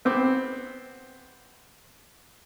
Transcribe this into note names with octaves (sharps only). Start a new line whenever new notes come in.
B3 C4 D6